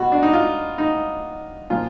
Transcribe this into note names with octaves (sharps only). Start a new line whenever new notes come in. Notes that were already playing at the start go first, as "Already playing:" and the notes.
Already playing: B2 F#4
D4
D#4
F4
D#4
A#2 F3 F4